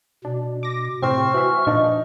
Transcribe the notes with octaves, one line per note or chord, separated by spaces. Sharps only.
B2 D4
D6 A#6
A2 C3 C4 C#6 F6
E3 F#4 E5
A#2 F3 D4 D#4